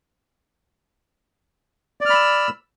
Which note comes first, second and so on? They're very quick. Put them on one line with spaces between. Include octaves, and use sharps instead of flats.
D5 F6 B5 E6